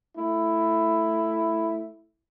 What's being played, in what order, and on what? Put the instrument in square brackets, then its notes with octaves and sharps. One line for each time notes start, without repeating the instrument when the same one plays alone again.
[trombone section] A3 E4